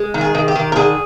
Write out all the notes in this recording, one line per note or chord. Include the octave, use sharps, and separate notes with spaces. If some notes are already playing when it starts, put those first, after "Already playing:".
Already playing: G#3
D#3
G#4
D#3
G4
D#3
A#4
D3 G#4